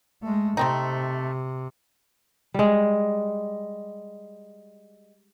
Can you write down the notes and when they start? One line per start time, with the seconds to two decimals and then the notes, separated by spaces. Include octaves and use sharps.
0.23 G#3 A3
0.57 C3 A3 C4 D#4
2.54 G3 G#3